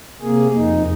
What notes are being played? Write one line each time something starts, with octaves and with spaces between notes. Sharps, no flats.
C3 A#3 G#4
F2 D#4